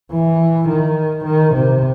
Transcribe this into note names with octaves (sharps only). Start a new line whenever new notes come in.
E3
D#3
D#3
C3